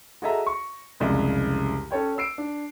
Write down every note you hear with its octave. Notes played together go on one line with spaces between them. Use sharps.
F#4 G#4 A4 D#5 E5 A#5
C#6
C2 F2 C#3 G#3
C#4 A4 C#5 G5
E6 C7 D7
D4